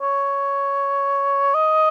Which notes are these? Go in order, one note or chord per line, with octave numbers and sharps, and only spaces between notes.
C#5
D#5